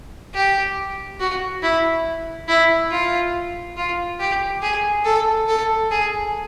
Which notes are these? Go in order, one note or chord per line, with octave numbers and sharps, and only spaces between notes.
G4
F#4
E4
E4
F4
F4
G4
G#4
A4
A4
G#4